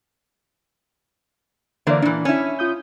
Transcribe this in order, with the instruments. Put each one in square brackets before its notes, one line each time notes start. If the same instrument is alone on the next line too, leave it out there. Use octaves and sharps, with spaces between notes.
[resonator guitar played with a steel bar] D3 E3 A#3 [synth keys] C5 D5
[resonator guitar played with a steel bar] A#2 E3 [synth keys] D4
[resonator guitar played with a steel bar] C#4 E4
[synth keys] F4 D#6 G6